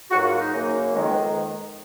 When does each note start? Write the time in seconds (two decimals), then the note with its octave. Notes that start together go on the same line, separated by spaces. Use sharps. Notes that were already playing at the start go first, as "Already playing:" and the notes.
0.11 G#2 F#3 A#3 F#4
0.25 F4
0.39 D#4
0.53 F#2 C#3 F#3 A#3
0.94 F2 D#3 G#3 C#4
1.09 B3